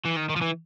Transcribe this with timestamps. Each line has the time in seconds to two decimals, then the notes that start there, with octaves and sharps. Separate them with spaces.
0.06 E3
0.17 D#3
0.30 D#3
0.36 F3
0.41 E3